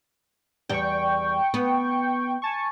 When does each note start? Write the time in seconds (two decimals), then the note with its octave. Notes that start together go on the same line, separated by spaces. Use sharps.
0.69 E2 G3 G5 C#6
1.54 B3
2.42 G#5 A5 C#6